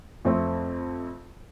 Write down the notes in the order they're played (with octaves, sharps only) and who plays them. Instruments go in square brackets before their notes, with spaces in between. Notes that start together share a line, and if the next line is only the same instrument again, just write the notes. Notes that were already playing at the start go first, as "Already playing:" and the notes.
[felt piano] F2 A3 C4